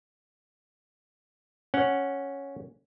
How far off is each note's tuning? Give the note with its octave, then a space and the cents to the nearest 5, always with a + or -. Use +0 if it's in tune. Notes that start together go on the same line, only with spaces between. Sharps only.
C#4 +0 F#5 +0